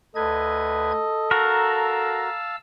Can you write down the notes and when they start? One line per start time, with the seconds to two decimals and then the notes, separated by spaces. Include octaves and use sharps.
0.16 D2 A4 B4 D#5 G#6
1.31 F#4 A#4 F5 A5 A#5 E6